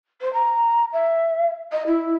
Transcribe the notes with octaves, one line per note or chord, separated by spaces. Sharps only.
C5
A#5
E5
D#5
E4